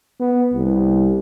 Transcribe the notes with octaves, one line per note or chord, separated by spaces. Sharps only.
B3
C2